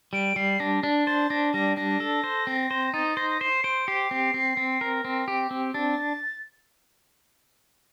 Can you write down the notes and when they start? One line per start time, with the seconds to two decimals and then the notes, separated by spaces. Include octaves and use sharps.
0.13 G3 D7
0.36 G3 C7
0.60 D4 A#6
0.83 D4
1.07 C5 A6
1.30 D4 A#6
1.53 G3 A#6
1.77 D4 A#6
2.00 A4
2.24 C5
2.47 C4
2.71 C5
2.94 D#4 A6
3.17 C5 A#6
3.30 A#6
3.40 C5 C7
3.64 C5 D7
3.87 G4 C7
4.11 C4
4.34 C4
4.57 C4
4.81 A#4
5.05 C4
5.28 G4
5.51 C4
5.74 D4 A6